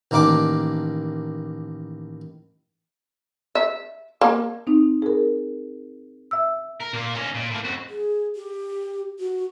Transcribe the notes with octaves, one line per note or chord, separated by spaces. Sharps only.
A1 D#3 A#3 D4 D6
E5
A#3
C4 D#4
G#4 A#4
E5 E6
A#4
A#2 A#3
C#4 D#4
A#2
A2 A#3
F2 F#4
G#4
G4
F#4